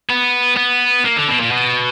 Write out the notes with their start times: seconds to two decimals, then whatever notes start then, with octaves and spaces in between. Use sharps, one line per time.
0.09 B3
0.57 B3
1.04 A#3
1.16 D3
1.28 B2
1.40 A#2
1.51 B2